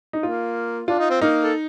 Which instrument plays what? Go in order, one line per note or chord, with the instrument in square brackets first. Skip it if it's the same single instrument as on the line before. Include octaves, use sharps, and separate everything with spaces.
[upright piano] D#4
[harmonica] A#3 [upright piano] F4
[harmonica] D4 [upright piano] F4
[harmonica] D#4
C4
[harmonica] A#3 [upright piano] D#4
[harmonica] A4